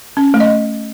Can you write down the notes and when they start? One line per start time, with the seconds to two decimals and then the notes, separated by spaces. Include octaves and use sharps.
0.17 C#4
0.34 A3
0.40 D#5